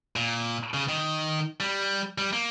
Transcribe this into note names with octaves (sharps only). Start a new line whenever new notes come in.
A#2
C#3
D#3
G3
G3
A#3